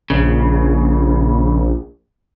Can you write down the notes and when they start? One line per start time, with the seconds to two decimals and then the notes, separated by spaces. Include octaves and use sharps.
0.10 A#1 C#3